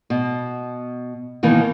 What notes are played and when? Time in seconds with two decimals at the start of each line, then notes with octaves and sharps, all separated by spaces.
0.10 B2
1.43 B2 D#3 E3 A#3